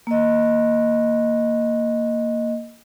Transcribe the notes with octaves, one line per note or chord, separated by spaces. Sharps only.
A#3 D#5